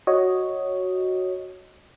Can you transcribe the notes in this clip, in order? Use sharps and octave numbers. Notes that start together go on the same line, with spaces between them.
F#4 C#5 D#5